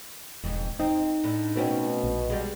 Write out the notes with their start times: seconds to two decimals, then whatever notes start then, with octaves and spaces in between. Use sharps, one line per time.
0.44 E1 F2 G#2
0.79 C4 D#4
1.24 A2 D4
1.56 B2 A3 C4 C#4
2.04 A#1
2.30 G3 G#3